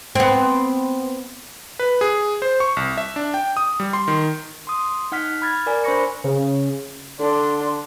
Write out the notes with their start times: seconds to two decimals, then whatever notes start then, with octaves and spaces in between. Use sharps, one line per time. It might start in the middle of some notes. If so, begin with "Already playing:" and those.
0.15 B3 C4
1.79 B4
2.01 G#4
2.42 C5
2.60 C#6
2.77 C2
2.97 E5
3.16 D4
3.34 G5
3.57 D#6
3.80 G3
3.93 C6
4.08 D#3
4.67 C6 D#6
5.12 D#4 F#5 F6 B6
5.42 B5 F6 G#6 A6
5.66 A#4 D5 G#5
5.84 D4 C5 B5 C#6 A#6 C#7
6.24 C#3
7.20 D3 D4 A4 C6